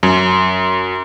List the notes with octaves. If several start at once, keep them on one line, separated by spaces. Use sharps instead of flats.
F#2